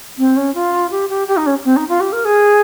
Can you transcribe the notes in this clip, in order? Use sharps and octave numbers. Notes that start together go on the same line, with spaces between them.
C4
C#4
F4
G4
G4
G4
D#4
C#4
C4
D#4
F4
G4
A#4
G#4